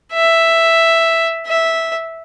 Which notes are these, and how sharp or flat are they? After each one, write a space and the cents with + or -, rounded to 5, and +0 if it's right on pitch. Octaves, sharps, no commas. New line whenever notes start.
E5 +5
E5 -5